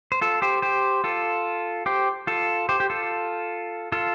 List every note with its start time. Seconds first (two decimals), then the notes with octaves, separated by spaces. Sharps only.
0.12 C5
0.21 F4 A4
0.42 G4 C5
0.62 G4 C5
1.04 F4 A4
1.86 G4 C5
2.27 F4 A4
2.69 G4 C5
2.80 G4
2.90 F4 A4
3.92 F4 A4